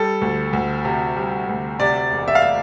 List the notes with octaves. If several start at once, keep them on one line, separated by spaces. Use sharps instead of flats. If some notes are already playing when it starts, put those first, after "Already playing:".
Already playing: G3 A4
D2
D2
C3
G3
D2
C3 D5
E1
E5
F5
E5